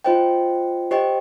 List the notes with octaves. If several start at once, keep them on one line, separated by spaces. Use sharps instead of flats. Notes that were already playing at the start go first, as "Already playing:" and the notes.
F4 C5 D#5 G5
G4 C5 D#5 G5